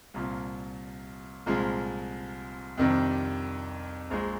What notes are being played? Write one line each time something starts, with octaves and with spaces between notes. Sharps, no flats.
C2 A#2 F3
C2 A#2 F3 G#3
F2 C3 D#3 G3 D4
A#1 A#2 G#3